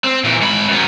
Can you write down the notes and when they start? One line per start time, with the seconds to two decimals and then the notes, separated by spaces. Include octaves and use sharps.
0.04 C4
0.24 A#2 E3
0.41 G#2 B5
0.68 F#2 B3